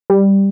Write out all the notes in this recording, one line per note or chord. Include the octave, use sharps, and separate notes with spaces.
G3